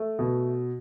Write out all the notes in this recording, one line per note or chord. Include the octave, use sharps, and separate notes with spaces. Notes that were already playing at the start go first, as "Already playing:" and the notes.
Already playing: A3
B2